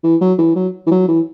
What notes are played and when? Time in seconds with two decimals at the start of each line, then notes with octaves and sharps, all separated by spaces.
0.04 E3
0.21 F#3
0.38 E3
0.56 F#3
0.87 E3
0.91 F#3
1.08 E3